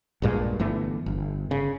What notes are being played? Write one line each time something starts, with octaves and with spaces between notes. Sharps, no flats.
A#1 G2 A#2 G#3
G1 E3 A3 B3
G1
C#3